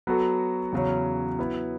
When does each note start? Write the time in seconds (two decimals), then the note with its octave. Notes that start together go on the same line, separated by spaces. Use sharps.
0.07 F#3 B3 F#4 A4
0.72 E2 C#3 F#3 C#4
1.39 F#3 B3 E4 B4